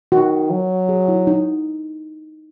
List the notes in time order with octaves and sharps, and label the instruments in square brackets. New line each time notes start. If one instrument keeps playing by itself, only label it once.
[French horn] D#3 [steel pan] F#4
[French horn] F#3
[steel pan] G#4
E4
D#4